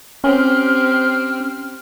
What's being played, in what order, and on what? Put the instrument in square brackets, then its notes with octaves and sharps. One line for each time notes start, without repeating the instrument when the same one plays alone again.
[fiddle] C4 G4 [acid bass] C#4 [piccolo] F6